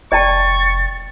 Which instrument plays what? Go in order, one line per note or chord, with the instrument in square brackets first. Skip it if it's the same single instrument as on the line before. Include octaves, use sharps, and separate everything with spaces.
[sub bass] F1 [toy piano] D5 G5 A5 [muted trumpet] C#6 [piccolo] A6